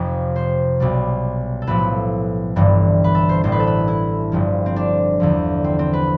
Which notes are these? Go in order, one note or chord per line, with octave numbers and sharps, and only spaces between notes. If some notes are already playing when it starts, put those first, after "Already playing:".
Already playing: F1 F2 C3 G4
C5
B1 B2 G3
A4
B1 A2 F3 B4
G1 G2 E3 G3
B4
A4
C5
A1 A2 G3 C5
B4
A4
B4
E4
G1 G2 F3
C4
D4
E2 D3 F3
C4
C4
B4